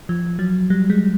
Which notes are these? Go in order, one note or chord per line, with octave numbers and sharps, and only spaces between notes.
F3
F#3
G3
G#3